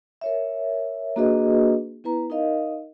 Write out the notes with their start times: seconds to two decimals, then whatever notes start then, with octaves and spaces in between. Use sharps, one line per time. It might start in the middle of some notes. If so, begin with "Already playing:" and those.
0.21 A#4 C#5 E5
1.16 A#3 D4 F#4 G#4 B4 D#5
2.04 B3 E4 B4 A#5
2.30 D#4 A#4 D#5 F5